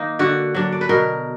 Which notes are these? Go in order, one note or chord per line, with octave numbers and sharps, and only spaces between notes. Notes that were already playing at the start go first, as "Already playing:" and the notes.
Already playing: D#3 A#3 D#4
D3 F#4
F#3 D4
D5
B4
B2 A#4